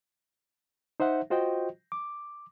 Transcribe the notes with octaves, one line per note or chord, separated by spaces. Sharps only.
D#4 C5 E5 F#5
F4 F#4 C5 D#5 G5
D6